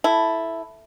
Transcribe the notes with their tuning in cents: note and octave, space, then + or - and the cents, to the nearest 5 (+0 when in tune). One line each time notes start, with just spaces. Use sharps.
E4 +0 A4 +0